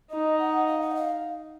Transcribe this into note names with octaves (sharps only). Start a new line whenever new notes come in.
D#4 D#5
F#5
F5
F#5
D#5
F5